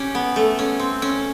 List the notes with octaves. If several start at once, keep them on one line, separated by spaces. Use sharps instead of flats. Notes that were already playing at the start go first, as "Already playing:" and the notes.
Already playing: C#4 G4
B3
A3
C#4
C4
C#4